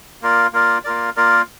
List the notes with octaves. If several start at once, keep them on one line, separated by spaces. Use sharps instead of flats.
A#3 F4 A#4 D5
A#3 F4 A#4 D5
A#3 F4 A#4 D5
A#3 F4 A#4 D5